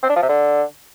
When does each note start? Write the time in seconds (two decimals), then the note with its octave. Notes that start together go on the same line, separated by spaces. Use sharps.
0.03 C4
0.09 D4
0.16 F3
0.22 C3
0.29 D3